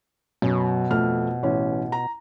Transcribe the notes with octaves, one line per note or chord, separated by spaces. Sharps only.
F#2 B2
F2 A3 F6
A1 C#4
A#5